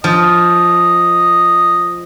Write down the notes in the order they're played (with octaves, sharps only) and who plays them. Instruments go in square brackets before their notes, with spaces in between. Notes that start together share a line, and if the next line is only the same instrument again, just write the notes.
[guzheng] F3 [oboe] D#5